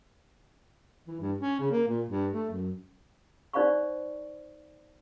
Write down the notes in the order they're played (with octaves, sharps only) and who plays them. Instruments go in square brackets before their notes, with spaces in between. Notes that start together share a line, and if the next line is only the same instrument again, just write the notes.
[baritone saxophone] E3
G2
C#4
C#3
A#3
A#2
G2
A3
F#2
[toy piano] D#4 C5 D5 F5 B5 C#6